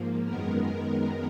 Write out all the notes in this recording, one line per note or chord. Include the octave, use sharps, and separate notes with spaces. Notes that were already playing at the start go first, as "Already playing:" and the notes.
Already playing: G#2 F3 A#3
F#2 D#3 G#3 B3 A#4